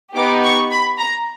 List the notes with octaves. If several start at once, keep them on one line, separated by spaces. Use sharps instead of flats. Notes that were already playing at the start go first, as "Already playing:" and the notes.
B3 D#4 G4 D6
C#6
B5
A#5